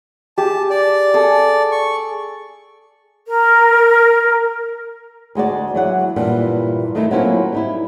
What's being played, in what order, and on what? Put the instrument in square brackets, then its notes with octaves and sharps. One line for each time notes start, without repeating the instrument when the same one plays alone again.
[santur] G4 G#4 [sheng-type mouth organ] A5
[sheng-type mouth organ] D5
[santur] G#4 A4 D#6
[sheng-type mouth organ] C#6
[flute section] A#4
[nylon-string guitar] D2 G#3 F#4 D5
E3 F#3 F#5
G2 A#2 E3
D#3 A3 D#4 E4
F#3 A#3 C4 C#4 E4 F4
G3 D#4 E4